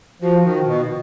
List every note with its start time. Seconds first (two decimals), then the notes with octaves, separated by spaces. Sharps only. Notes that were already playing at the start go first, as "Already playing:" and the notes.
0.22 F3 F#4
0.44 D#3
0.66 B2